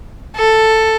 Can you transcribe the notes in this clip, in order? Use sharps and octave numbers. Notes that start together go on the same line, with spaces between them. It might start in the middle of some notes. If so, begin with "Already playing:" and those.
A4